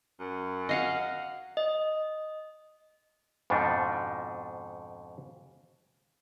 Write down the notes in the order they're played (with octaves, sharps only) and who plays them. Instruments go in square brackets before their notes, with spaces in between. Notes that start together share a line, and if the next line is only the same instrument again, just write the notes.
[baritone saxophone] F#2
[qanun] D#5 F5 F#5
[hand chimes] D#5
[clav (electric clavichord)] F2 G#2 B2 F3 D4 D#4